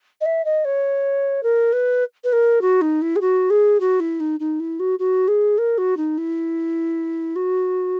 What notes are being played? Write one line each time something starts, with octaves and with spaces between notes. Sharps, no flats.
D#5
E5
D#5
C#5
A#4
B4
B4
A#4
F#4
D#4
E4
G#4
F#4
G#4
F#4
E4
D#4
D#4
E4
F#4
F#4
G#4
A#4
F#4
D#4
E4
F#4